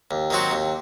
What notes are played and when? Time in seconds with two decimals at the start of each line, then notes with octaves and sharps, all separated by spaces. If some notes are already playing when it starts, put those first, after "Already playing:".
0.11 D#2
0.30 D#3 F#3 C4 F#4
0.51 D#2